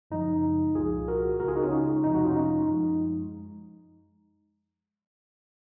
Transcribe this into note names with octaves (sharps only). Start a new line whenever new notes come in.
F#2 C#3 F3 G#3 D#4
C2 A#2 F3 F4 G#4
F#4 A#4
C#2 C#3 G#3 F#4 A#4
F4 G#4
D#4 F#4
C#4 F4
D#4
F2 C3 F3 G#3 D#4
D#4 F#4
C#4 F4
D#4
F#2 F3 G#3